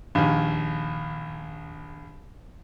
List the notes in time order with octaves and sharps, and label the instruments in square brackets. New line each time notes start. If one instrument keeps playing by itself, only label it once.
[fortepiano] A#1 D#2